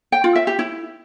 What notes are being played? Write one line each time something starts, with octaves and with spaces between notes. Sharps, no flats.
G5
F4
E5
G4
E4